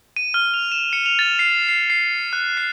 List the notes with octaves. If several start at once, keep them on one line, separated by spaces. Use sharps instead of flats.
D#7
F6
F7
E7
C#7
F7
A6
C7
C7
C7
F#6
C7